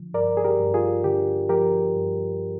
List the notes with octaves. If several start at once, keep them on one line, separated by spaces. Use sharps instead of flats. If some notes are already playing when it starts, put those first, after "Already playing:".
Already playing: D3 F3
G2 A#4 D5
G#4
G4 A#4
G2
F4 G#4
D3 G4
F3 G4 A#4
G2